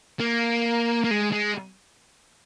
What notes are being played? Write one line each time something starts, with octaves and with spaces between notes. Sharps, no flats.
A#3
A#3
G#3
G#3